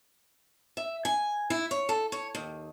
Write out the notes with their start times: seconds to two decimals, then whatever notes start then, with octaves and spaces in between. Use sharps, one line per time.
0.77 E5
1.05 G#5
1.50 E4
1.71 C#5
1.89 A4
2.12 C#5
2.35 D#2